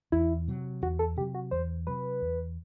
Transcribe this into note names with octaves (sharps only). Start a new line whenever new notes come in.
E2 E4
C3 F#3
E2 F#4
A4
C3 F#3 G4
F#4
E2 C5
C3 F#3 B4
E2